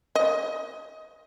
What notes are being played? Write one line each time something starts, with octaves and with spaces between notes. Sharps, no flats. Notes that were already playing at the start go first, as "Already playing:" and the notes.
D#5